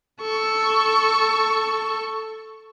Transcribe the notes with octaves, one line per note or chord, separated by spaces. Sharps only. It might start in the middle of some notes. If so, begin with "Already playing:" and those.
A4 C#6